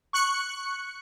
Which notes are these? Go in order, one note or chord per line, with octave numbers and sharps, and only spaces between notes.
C#6 F#6 C#7